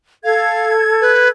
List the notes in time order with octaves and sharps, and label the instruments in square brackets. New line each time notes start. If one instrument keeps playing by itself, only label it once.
[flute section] A4 G#6 [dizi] F5
[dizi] B4